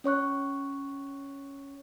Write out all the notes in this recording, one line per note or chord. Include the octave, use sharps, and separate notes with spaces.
C#4 C#5 C#6 F#6